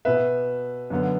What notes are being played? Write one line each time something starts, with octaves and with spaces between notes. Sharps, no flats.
B2 B3 B4 E5
F#2 D3 B3